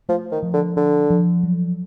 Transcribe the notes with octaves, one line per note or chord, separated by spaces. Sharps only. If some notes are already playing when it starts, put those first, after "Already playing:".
F3 A3
D#3
F3
D3
D3 D4
F3
F#3